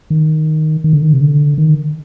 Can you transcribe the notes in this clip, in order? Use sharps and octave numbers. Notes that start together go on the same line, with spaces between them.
D#3
D#3
D3
D#3
C3
D3
D#3